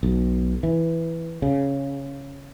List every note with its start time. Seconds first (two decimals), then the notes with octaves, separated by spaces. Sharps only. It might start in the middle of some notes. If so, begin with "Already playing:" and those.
0.03 B1
0.63 E3
1.42 C#3